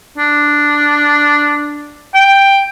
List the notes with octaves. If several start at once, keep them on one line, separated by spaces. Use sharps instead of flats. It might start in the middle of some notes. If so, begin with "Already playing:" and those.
D4
G5